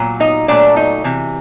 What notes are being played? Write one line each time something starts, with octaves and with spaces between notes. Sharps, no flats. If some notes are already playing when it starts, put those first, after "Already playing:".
Already playing: A#2 F#3
D#4 D#5
A#2 F#3 A3 D4 D5
D#4 D#5
C3 E3